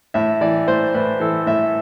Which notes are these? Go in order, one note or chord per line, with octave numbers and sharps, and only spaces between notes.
A2 E5
E3 D5
A2 C5
A2 B4
E3 A4
A2 E5